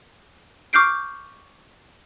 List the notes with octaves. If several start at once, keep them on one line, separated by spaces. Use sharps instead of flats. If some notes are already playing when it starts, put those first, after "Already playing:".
C#6 D6 F6 G6 C7 D7